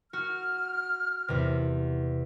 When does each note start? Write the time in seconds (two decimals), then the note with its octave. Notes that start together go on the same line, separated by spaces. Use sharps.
0.13 F#4 F6
1.28 E2 C3